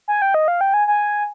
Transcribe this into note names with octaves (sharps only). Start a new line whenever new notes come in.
G#5
G5
D#5
F5
G5
G#5
G#5